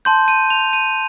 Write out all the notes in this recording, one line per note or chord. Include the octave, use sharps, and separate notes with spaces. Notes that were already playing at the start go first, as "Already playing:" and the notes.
A5 C6 G6
D#7
F7
D#7